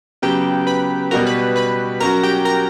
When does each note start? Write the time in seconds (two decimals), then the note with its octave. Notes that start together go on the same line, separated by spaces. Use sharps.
0.22 C#3 F#3 B3 G4 G5
0.67 B4 B5
1.11 B2 G3 B3 F#4 A#4 A#5
1.27 B4 B5
1.56 B4 B5
2.00 F#3 C#4 F#4 A#4 A#5
2.23 G4 G5
2.45 A#4 A#5